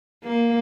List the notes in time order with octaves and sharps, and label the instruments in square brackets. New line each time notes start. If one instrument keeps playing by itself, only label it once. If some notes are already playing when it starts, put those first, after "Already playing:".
[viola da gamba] A#3